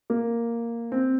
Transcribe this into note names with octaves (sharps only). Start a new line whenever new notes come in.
A#3
C4